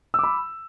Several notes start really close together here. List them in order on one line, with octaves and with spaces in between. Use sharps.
E6 D6 B5